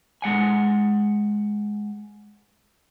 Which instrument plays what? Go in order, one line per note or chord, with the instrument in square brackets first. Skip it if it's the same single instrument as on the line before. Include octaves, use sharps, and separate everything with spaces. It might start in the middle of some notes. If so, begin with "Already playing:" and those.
[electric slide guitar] G#3 F#5 G#5